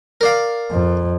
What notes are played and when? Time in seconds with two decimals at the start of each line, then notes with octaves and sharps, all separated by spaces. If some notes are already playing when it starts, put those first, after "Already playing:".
0.21 A#4 D5 F5
0.72 F2